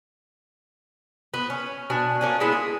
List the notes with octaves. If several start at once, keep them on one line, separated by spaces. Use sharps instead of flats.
B3
C#4
B2 D4 G#5
A#3 C#4 D4 G#5
G#3 B3 E4 G#4
G#4